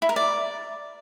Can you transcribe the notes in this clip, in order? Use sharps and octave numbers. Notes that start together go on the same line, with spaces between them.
E4
A#4
D5